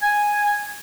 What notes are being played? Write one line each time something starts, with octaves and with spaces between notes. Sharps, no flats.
G#5